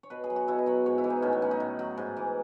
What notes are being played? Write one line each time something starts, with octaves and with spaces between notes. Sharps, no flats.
C#5
B2 B4
G#4
F#3
F#4
B2 E4
D#5
F#3 C#5
G#2 C#5
E4
E3
D#4
A2 C#4
B3
F#3 C#4
D#4
A2
F#3
G#2
E3